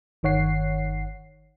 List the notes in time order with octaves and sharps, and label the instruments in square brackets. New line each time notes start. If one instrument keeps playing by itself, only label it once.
[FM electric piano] G1 D#3 C#5 F#5 C7